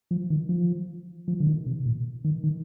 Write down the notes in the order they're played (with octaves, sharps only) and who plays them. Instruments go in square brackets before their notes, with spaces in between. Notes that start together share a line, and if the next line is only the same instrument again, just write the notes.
[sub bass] F3
D#3
F3
F3
D3
D#3
C3
A#2
D#3
D#3